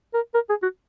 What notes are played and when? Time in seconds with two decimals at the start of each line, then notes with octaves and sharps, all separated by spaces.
0.14 A#4
0.34 A#4
0.49 G#4
0.63 F#4